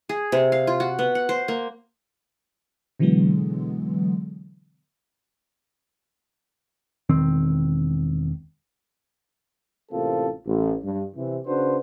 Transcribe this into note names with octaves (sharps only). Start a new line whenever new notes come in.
G#4
C3
F5
F4
F#4
B3
F#5
C5
A#3
B2 D3 E3 F#3 G#3 B3
E1 D#3 C4
A1 C3 A#3 C4 F4 A4
A1
G2
C3 E3
C#3 D4 F#4 B4 C5